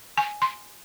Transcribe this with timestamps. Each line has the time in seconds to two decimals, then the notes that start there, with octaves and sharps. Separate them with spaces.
0.18 G#5
0.42 C6